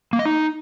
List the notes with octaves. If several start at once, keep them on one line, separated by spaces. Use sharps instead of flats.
A#3
D#5
D#4